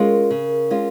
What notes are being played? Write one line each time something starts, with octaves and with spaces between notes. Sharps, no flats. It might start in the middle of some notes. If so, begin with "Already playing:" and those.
Already playing: G#3 C#4 F4 A#4
C#3
G#3 C#4 F4